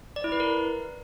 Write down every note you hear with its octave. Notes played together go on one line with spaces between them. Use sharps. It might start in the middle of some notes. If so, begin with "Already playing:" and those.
D5
E4
B4
A#4